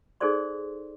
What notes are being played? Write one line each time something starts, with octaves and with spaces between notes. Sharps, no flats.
D#4 G#4 A4 C5 D5 C6